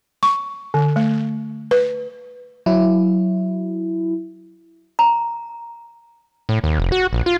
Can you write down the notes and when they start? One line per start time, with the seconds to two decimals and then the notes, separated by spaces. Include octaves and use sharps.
0.23 C#6
0.74 D3
0.96 A3
1.71 B4
2.66 F#3 E4
4.99 A#5
6.49 A2
6.64 D#2
6.79 F1
6.92 F#4
7.13 A#1
7.26 F4